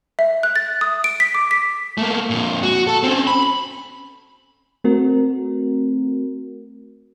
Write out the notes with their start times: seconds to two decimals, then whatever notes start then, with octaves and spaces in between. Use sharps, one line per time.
0.19 E5
0.43 F#6
0.56 A6
0.81 D#6
1.04 D7
1.20 B6
1.34 D6
1.51 B6
1.98 A3 A#3
2.30 F2 A#2
2.63 F#4
2.87 A4
3.03 C4 C#4
3.27 B5
4.84 A3 C4 F#4 A#4